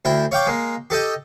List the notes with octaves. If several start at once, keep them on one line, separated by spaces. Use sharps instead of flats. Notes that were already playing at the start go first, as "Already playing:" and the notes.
D2 E4 G5
C#5 F5 G5 D6
G#3 A#3
G4 A4 D#5 G5